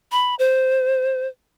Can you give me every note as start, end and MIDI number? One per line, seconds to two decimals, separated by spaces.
0.12 0.35 83
0.39 1.27 72